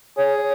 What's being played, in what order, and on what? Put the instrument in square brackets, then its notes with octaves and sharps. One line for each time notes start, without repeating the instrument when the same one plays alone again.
[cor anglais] G#4 [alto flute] C#5